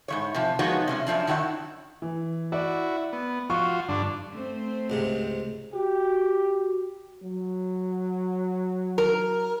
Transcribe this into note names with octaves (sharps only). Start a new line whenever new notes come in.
G#2 F3 C#5
C3 F3
F3 G#3 B3 D#4 F#4 C#5
C3 G#3 C#4
F#2 A#2 F3 D4
F#2 D#3 F#3 E4 F4 F#5
E3
E4 F#4 D5
B3
F3 F4 F#4 C#6
G2 D3 D4
A3 C4 C5
C#2 G#2 C3
F#4 G4
F#3
A#4